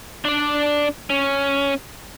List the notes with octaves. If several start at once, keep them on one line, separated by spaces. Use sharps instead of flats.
D4 D5
C#4